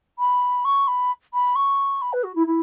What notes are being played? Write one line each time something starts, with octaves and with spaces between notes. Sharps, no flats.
B5
C#6
B5
B5
C#6
B5
B4
F#4
E4
E4